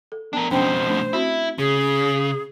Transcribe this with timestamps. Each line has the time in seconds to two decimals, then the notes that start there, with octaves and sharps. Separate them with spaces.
0.12 A4
0.33 B3 D4 A#4 A5
0.51 F2 B2 C#4 D4 C5 G5
0.86 A3 D4
1.13 C4 E4 F#4 B5
1.58 C#3 G#4